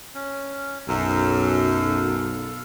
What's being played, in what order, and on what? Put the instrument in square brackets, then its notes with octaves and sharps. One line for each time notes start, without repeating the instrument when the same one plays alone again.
[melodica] C#4
[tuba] B1 [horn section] F#2 [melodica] A4 F5